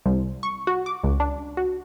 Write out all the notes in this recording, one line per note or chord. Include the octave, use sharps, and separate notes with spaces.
C2
C#6
F#4
D6
C#2
D4
F#4